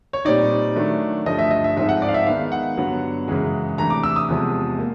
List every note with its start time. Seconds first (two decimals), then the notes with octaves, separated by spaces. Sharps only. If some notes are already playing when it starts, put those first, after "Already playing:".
0.13 C#5
0.25 A#2 G3 C4 D#4 D5
0.75 D#3 F#3 A3 D4
1.26 G2 D3 F3 A3 D#5
1.39 E5
1.51 D#5
1.64 E5
1.76 G#2 F3 G#3 C4 D#4 E5
1.89 F#5
2.02 D5
2.09 F5
2.14 E5
2.27 D#3 G#3 B3 D#4 F5
2.52 F#5
2.77 G2 D3 F#3 B3 D4
3.28 F#2 C#3 E3 G#3
3.78 C3 E3 A3 D4 A#5
3.90 D6
4.03 E6
4.16 D#6
4.28 E2 C3 F3 G#3
4.79 A#3